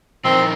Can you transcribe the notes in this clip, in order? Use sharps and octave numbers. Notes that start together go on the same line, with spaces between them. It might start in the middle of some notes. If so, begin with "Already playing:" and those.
F3 C4 D#4 A#4